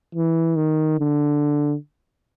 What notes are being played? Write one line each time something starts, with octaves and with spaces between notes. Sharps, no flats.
E3
D#3
D3